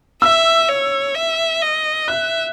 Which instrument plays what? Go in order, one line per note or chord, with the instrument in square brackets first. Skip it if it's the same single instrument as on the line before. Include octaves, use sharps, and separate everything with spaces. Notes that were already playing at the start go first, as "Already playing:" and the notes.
[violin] E5 [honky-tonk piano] E6
[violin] C#5
E5
D#5
[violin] E5 [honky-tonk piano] F#6